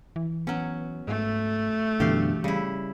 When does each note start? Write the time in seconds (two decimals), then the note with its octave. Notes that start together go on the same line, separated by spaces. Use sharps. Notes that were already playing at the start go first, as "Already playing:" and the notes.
0.16 E3
0.47 F#3 B3 C#4
1.08 G#2 A3
2.00 F#2 B2 D3 E3 G4 F5
2.44 C#3 G3 E4